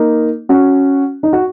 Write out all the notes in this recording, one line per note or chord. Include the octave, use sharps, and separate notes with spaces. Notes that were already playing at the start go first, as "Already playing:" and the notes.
Already playing: A#3 D#4
C#4 F#4
D#4
F#4